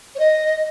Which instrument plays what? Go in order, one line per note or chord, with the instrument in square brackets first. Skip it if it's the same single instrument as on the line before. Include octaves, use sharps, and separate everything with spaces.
[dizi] C#5
D#5